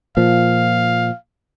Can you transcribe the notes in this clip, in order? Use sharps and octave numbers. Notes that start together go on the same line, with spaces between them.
A#2 F3 F5